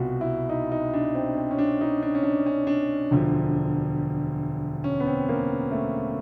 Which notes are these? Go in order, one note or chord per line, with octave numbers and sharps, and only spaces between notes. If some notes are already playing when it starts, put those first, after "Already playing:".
Already playing: C2 B2 F4 F#4
E4
D#4
D#4
D4
C4
C4
C#4
D4
D#4
D4
C#4
D4
C#4
D4
E1 D2 D3 F3
C#4
B3
C4
A#3
A3